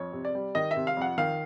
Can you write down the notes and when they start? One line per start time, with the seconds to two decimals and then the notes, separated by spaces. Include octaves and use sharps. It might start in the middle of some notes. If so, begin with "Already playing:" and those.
Already playing: F2 C#5
0.13 C3
0.25 D5
0.35 G3
0.55 D#3 D#5
0.71 E5
0.76 C3
0.87 F5
0.97 F2 F#5
1.18 D#3 F5